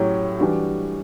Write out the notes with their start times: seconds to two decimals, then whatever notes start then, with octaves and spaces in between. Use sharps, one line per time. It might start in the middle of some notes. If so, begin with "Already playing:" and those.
Already playing: A2 F#3 C#4 E4 G4
0.40 E3 G3 D4 F#4